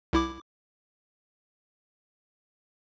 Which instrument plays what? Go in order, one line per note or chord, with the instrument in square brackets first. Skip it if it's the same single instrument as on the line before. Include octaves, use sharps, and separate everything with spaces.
[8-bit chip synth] C2 E4 D6